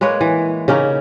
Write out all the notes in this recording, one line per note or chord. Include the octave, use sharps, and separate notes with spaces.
G#3 A#3 B4 C#5
E3
C#3 A#3 C#4 D#4